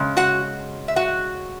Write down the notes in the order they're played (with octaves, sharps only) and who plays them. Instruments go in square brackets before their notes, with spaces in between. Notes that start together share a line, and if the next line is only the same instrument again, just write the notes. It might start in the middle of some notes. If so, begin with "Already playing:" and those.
Already playing: [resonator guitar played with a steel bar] C#3 G#3
F#4 F#5
E5
F#4 F#5